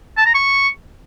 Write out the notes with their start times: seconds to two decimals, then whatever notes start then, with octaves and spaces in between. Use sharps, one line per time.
0.17 A5
0.26 A#5
0.34 C#6